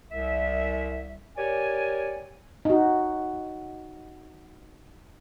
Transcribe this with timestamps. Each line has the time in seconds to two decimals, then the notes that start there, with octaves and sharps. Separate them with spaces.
0.11 C2 E5
1.37 G4 A#4 C#5 D5 G#5
2.65 D#4 F#4